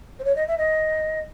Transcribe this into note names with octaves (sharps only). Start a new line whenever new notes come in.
C5
C#5
D#5
E5
D#5